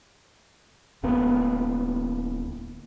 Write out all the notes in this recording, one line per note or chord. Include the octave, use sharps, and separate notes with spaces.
D1 A#3 B3